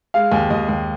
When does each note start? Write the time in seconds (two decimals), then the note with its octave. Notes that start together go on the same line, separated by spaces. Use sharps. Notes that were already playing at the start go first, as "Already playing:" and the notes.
0.14 G#3 F5
0.32 D#2 G#5
0.50 D#2 D#5
0.69 D#2